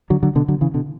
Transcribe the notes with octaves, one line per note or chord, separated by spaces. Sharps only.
D3 F#3
D3 F#3
B2 D3
D3 F#3
C#3 E3
B2 D3